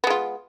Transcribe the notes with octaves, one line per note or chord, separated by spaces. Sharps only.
G#3 B3 F4